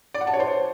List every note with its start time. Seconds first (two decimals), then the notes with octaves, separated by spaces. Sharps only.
0.14 D5
0.21 F#5
0.27 A5
0.33 C#5
0.40 C5